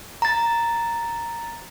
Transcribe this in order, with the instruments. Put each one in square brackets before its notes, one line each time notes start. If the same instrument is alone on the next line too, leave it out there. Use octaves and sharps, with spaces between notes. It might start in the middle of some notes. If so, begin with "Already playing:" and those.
[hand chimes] A#5 A6